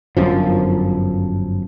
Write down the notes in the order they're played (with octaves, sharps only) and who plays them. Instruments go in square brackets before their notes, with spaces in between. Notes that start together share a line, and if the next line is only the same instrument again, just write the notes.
[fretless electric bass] G1 F#2 F3